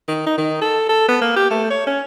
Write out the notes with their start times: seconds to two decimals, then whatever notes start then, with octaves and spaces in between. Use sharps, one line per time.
0.08 D#3
0.26 D#4
0.38 D#3
0.62 A4
0.89 A4
1.08 B3
1.21 A#3
1.36 G4
1.51 A3
1.70 C#5
1.87 C#4